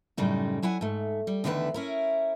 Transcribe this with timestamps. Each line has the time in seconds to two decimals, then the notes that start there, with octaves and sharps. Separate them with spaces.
0.17 F#2 A2 C#3 G3 D#4
0.62 F#3 E4 F#5 G#5
0.81 G#2 A3
1.27 G3
1.44 E2 D3 D#3 A3 F#4 B4
1.74 C#4 E4 A#4